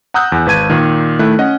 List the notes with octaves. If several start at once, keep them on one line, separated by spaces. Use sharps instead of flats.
F#5 A#5 D#6 E6 F#6 G6
E2
G#1 B4 A5 G#6 D#7
A#2 D#3
D#3 A3 E4 F#6
C#4 D#5 F#5